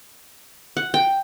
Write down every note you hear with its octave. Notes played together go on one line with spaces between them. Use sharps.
F#5
G5